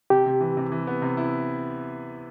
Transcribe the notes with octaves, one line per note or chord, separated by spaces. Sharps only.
C3 G4
C3
E3
C3
E3
B3
C3
E4